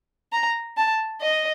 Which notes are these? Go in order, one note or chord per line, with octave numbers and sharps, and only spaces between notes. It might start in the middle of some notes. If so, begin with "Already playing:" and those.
A#5
A5
D#5